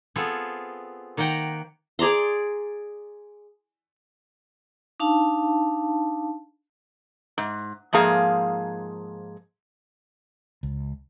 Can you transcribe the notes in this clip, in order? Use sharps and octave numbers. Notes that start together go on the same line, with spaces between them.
B3 C4 F4 G#4 A4
D#3 A#3 F#5 G5 A#5
G#4 D5 A#5 C6
D4 D#4 F5 A5
G#2
G#2 F3 A#3 G#4 F5
C#2